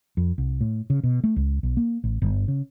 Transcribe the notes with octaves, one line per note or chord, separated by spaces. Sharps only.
F2
C2
A2
C#3
B2
A3
C#2
B1
A#3
A1
G1
C#3